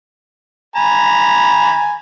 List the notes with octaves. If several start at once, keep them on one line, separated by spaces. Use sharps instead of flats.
G#5 A#5 B5